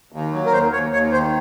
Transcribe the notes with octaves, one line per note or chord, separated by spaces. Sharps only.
D#2
F#3
A#4
D#2 C5
D#2 C#5
D#2 C#5
D#3 C5